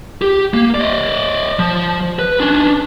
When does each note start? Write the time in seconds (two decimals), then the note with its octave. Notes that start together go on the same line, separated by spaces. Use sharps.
0.22 G4
0.54 A#3
0.74 D5 D#5
1.59 F3
2.19 B4
2.40 C#4 D4